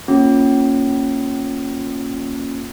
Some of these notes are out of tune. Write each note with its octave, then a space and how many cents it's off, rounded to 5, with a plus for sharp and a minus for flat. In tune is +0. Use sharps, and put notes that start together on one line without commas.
A#3 +0 C#4 -10 F4 +20